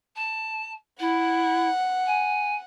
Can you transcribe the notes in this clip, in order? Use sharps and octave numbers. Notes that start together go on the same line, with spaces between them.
A5
E4 F#5
G#5